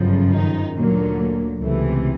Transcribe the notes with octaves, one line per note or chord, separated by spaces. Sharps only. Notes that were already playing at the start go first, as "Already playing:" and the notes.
Already playing: G1 F#2 C#3 F3
D#3 D#4
D2 A#2 D3 F#3 A#3
C#2 C3 E3 A3